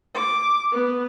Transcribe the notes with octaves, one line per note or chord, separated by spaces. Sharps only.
D6
B3